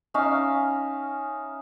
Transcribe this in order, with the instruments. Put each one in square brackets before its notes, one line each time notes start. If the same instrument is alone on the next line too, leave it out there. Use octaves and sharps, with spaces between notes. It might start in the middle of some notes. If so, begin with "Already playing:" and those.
[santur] C#4 D#4 E5 F5